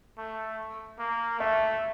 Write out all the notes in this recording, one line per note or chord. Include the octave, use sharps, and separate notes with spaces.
A3
A#3
A3 E5